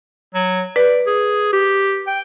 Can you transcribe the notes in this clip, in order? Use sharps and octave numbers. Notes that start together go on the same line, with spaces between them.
F#3
B4 D5
G#4
G4
G5